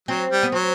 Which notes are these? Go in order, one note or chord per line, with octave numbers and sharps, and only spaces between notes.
F#3 C4
G3
B3
F#3 C4